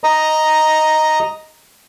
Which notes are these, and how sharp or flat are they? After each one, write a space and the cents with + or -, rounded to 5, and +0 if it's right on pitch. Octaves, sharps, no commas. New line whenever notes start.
D#5 +0 A#5 +0